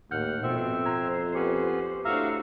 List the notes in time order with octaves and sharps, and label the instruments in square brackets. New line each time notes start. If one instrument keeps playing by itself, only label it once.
[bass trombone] D#2 [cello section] A2 [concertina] F#5 [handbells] F6 G6
[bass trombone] F2 [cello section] B2 [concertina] C4 E5
[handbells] F4 A#5 G#6 [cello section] C5
[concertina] B3 C#4 [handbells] G4
[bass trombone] A2 [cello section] D4 F#4 C5 [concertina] E5 F5 A#5